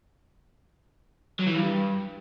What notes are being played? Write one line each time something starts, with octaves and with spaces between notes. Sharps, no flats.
F#3
E3
G2